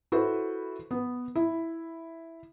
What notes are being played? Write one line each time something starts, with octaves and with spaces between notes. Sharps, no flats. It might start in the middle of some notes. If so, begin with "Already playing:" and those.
E4 F#4 A4 B4 C5
B3
E4